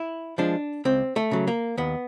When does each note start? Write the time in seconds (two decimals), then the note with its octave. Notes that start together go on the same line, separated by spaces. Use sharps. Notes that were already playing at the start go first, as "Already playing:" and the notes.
Already playing: E4
0.38 F3 G#3 D4
0.85 C#2 C4
1.16 A3
1.31 C#3 F#3
1.48 A#3
1.78 D#2 B3